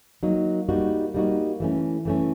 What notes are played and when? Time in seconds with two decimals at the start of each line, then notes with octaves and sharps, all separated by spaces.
0.23 F#3 A#3 D#4
0.68 G3 A#3 D#4 F#4
1.14 G3 A#3 D#4 F#4
1.60 E3 A3 C#4
2.05 E3 A3 C#4